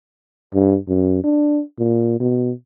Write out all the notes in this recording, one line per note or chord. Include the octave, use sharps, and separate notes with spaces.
G2
F#2
D4
A#2
B2